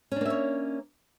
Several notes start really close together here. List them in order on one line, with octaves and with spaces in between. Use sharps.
C#4 D4 A#3 E5 C#5